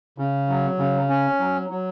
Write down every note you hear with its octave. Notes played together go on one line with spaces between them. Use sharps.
C#3
F#3
C#3
C#4
F#3
F#3